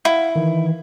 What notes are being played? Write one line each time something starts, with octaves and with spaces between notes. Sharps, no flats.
E4 F5 F#5
D#3 E3